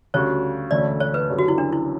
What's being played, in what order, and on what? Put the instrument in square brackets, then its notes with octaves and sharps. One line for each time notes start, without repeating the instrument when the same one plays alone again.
[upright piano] D2 C#3 G3 C#4 F#4 [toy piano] C#5
[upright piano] E1 D2 D3 A3 C#4 [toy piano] D5
[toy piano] C#5
B4
[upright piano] F#1 F#2 D3 G3
[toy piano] F#4
E4
D4
E4